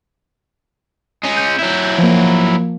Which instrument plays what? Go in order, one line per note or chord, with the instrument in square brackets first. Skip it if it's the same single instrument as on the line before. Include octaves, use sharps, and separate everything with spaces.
[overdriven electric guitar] G#3 C#4
[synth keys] G6
[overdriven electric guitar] F#3 E4
[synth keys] F3 A#3